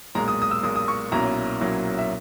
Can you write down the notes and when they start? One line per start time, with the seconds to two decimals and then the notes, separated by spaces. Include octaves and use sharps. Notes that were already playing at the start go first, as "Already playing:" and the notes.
0.15 B1 A#2 G#3 A#5
0.28 D#6
0.42 D#6
0.51 E6
0.63 B1 A#2 G#3 D#6
0.76 D#6
0.88 C#6
1.12 B1 A#2 F#3 C#4 E4 A#5
1.60 B1 A#2 F#3 C#4 E4
1.98 E5